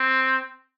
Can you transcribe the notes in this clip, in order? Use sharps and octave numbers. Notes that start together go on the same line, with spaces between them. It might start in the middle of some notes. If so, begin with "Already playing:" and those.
Already playing: C4